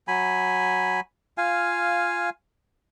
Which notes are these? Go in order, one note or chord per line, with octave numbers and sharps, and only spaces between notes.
F#3 G#5 B5
F4 F5 G#5